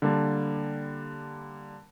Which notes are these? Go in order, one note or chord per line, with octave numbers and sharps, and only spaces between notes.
D3 G3 A#3 D4